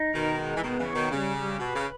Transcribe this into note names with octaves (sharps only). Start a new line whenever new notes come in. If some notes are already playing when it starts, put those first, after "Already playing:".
Already playing: D#4
B2 D#3 A#4
G#3
E3
B2 D#3 B3
C#3 E3
C#5
B2 D#3
C#3 G3
G4
B2 B4
C#3